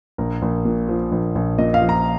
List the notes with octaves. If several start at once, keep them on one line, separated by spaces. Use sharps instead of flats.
A#1 A#4
A#1
A#2
F3
A#1
A#1
A#2 D#5
F5
F3
A#5